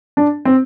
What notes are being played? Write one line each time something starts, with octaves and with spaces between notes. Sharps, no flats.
D4
C4